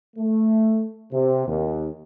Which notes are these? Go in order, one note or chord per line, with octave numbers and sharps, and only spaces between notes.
A3
C3
D#2